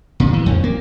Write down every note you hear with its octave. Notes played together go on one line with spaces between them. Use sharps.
A#2
E3
F2
A#3